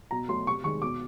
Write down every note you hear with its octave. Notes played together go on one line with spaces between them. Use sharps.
B2 A#5
F#3 A3 C6
C3 C#6
D#3 G#3 C#6
B2 D6